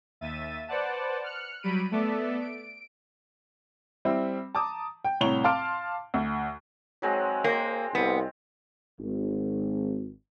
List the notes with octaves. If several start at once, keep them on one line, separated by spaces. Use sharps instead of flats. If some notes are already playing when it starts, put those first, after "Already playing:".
D#2 E5 A6 D#7
B4 C5 D5 F#5 A5
F6 F#6 C#7
F#3 G3 B5 D7 D#7
A3 B3 A4 D5 E5
D7
G3 C4 E4
A5 A#5 D6 D#6
G5
C2 A2 C#5 A#5 F7 G7
F5 A5 C6 D6 F6 D7
D2
F#3 G#3 C4
A#3 C4
C2 B3
G#1